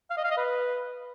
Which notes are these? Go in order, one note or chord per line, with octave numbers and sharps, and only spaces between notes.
F5
D#5
F5
D#5
B4